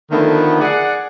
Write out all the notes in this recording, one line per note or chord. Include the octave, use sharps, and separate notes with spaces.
D3 D#3 F3 A3 B3
G#4 D5 F#5